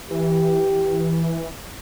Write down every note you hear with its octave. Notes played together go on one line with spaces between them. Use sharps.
E3 G4